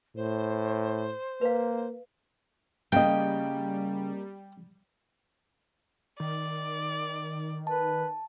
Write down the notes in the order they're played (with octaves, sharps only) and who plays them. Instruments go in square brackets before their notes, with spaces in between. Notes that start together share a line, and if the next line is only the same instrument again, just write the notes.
[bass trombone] A2 [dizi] C5
[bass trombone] A#3 [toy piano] B4 F5
[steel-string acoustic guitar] C#3 [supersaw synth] G3 [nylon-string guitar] A#3 D#5 [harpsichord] G5
[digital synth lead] D#3 [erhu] D5
[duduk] B4 [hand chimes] A5